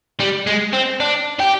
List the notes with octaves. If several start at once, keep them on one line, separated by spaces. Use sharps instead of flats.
G3
G#3
C4
D4
G4